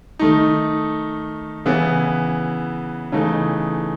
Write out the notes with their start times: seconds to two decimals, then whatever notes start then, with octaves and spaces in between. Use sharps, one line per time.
0.19 D#3 A3 D#4
1.65 C#3 E3 B3 E4
3.12 C#3 E3 A3 D#4